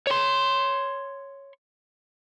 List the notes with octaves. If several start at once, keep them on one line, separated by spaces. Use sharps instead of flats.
C#5 C6